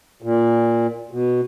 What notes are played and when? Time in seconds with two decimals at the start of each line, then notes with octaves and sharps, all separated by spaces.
0.22 A#2
1.11 B2